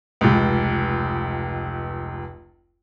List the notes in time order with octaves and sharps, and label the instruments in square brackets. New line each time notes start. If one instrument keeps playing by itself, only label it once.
[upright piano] F1 C#2